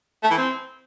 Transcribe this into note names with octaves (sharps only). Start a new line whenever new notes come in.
A3
E3
C4